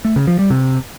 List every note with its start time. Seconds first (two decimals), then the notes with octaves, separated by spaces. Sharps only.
0.05 A3
0.16 C#3
0.27 F3
0.39 G3
0.50 C3